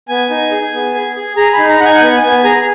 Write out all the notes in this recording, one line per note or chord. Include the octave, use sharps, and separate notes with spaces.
B3 G#5
D#4
G#4
B3
G#4
G#4
G#4 A#5
D#4 B5
A#5
D#4 F#5
G#5
F#5
B3 G#5
B3 G#5
G#5
G#4 A#5